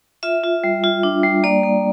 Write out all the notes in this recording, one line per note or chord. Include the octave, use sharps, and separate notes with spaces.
F4 E5
F4
G3
F4
D4
G3
A#3 D5
A#3